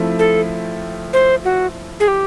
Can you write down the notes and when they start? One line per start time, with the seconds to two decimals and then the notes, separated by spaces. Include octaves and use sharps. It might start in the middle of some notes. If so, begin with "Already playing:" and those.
Already playing: F3 A3 C4 E4
0.19 A4
1.13 C5
1.44 F#4
2.00 G#4
2.08 G4